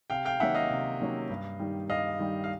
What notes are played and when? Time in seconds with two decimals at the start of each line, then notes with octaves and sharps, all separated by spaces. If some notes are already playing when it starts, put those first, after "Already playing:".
0.10 C3 F5 G5
0.25 F5 G5
0.40 D#3 F#3 A#3 C#4 E5 F#5
0.55 D#5 F5
0.70 C3
1.00 D#3 F#3 A#3 C#4
1.29 G2
1.59 D#3 G3
1.89 G2 D#5 F5
2.19 D#3 G3
2.44 F5